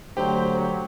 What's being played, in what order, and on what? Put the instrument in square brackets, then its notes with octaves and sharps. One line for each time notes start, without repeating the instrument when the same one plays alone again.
[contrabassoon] D2 [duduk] F#3 [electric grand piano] G4 [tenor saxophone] C5